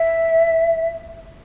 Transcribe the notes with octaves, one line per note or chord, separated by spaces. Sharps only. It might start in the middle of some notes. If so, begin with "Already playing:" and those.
Already playing: E5